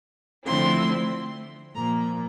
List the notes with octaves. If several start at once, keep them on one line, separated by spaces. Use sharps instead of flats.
D3 F3 A3 C4 E4 C6
A#2 F3 A#3 A#5